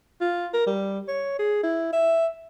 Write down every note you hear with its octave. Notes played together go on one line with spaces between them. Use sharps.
F4
A#4
G3
C#5
G#4
E4
E5